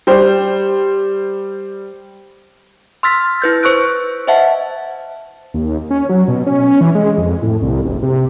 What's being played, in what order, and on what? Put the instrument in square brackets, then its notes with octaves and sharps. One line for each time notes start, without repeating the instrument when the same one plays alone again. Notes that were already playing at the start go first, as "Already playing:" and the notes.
[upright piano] G3 C5
[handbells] C6 E6 F6 A6 B6
E4 B4 G6 A6
B4 C5 C#6 E6 F#6 D7
C5 D#5 E5 F#5 A5
[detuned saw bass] D#2
C#4
F#3
B2
C#4
E3
G#3
F2
A2
C2
F#1
C3